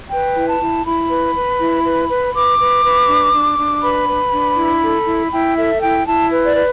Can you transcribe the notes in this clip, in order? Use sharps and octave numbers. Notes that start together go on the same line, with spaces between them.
B4 G5
E4
A5
E4
E4 B5
B4
B4
E4
B4
B4
B4 D6
B4
B4
D4
D4
D4
B4 B5
B4
D4
E4
A4
E4
E4 G5
A4 E5
E4 G5
E4 A5
B4
D5
B4